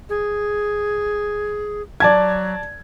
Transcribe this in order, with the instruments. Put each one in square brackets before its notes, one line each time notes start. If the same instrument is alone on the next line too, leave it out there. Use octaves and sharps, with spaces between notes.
[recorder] G#4
[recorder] F#3 [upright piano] D5 A5 G#6